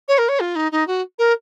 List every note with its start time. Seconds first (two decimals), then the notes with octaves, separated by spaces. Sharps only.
0.08 C#5
0.18 A#4
0.28 C#5
0.40 F4
0.55 D#4
0.72 D#4
0.87 F#4
1.18 A#4